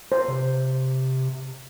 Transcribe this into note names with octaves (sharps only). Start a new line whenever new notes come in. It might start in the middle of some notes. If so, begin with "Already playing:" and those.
C5
C3